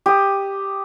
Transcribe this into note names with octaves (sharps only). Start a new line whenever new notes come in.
G4 D#6